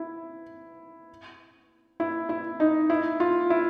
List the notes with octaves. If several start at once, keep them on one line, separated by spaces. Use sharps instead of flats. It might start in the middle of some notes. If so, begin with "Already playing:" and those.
Already playing: E4
E4
E4
D#4
E4
F4
E4